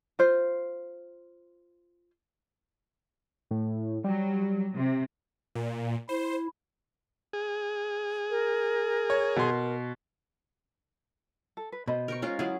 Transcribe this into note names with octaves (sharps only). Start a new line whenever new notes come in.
F4 C5
A2
F#3 G3
C3
A#2
E4 C5
G#4
A#4
C#5
B2 C6
A4
B4
B2 C5 D#5 B5
A#4 G5 C#6
G#3 C#4 F4
F#3 E4 G#4